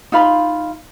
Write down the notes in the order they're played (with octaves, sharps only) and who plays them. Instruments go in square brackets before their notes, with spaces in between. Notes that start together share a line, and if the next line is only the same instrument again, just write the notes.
[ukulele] D#4 F4 F5 B5